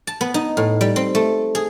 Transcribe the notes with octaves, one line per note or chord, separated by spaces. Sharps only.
A5
B3
D#4
A2
G3
C4
A3
G#4